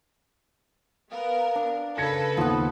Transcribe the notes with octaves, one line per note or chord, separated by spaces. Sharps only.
B3 A#4 F5 D#6
D4
C#3 A4 B4 G#6 A#6 C#7
D#2 F3 B3